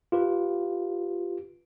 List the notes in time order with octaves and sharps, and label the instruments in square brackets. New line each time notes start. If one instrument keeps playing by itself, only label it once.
[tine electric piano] F4 G4 B4